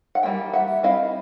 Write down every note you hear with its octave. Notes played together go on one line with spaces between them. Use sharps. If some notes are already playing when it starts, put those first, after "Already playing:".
F#5
E3 G3 A#3 G5
E5 F#5
G3 C4 E4 D#5 F5